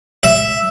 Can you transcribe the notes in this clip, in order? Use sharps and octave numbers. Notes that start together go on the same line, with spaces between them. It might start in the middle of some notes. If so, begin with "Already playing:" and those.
E5